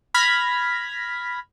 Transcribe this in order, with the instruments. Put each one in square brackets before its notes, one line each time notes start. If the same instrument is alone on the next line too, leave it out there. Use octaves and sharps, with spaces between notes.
[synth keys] B5 F6 G#6 A#6 B6